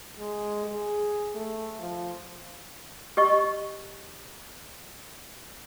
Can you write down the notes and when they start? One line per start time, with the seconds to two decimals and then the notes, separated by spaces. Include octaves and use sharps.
0.19 G#3
0.67 G#4
1.35 A3
1.79 F3
3.17 G4 D#5 C#6